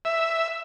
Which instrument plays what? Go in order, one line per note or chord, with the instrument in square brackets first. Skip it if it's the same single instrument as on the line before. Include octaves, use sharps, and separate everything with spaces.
[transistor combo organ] E5